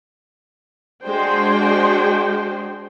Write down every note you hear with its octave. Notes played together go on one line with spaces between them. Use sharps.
G#3 D4 F#4 G#4 C5 G5